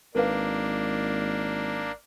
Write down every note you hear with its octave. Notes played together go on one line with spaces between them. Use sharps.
G#1 A#3 D4 A#4 B4 F5